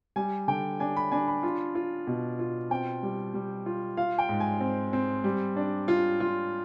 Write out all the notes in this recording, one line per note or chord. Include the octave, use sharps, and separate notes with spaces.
G3 G#5
D3 G5
D4 G#5
B5
D4 G#5
B5
F4
F4
B2
F4
C4 G5
G3
G3
F4
F4 F5
G5
G#2
G#5
C4
C4
G3
D4
F4
F4